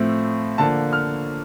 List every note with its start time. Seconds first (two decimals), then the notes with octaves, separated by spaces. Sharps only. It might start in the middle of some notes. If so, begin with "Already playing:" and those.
Already playing: A2 F3 A3 C4
0.58 D3 F3 A#3 A5
0.93 F6